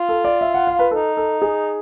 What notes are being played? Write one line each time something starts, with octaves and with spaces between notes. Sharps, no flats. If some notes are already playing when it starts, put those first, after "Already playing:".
Already playing: F4
A4
D5
E5
F#5
F5
B4
D#4 A4
A4
G#4